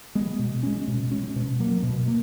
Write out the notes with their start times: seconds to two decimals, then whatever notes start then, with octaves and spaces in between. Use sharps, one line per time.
0.15 G#3 B3
0.39 B2
0.63 G#3 C#4
0.88 B2
1.11 G#3 C#4
1.36 B2
1.60 F#3 A#3
1.83 B2
2.08 A#3